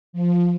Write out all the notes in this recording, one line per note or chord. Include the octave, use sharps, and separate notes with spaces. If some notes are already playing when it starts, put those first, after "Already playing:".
F3